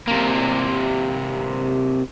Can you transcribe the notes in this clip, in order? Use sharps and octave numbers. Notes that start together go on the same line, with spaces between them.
C3 A#3